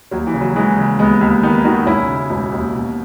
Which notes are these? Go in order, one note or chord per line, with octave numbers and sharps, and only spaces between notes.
D#2 F#3
E3
C#3
F#3
E3 G#3
C#3
D#2 G#3 B3
D#2
D#3 B3 D#4
D#3 D#4 F#4
E1 C#4 E4
C#3
E1
D#2
B2